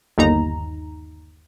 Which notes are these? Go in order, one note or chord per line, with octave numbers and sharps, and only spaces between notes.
G1 D#2 D#4 A#5